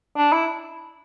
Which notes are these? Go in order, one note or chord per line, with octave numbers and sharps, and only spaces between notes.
D4
E4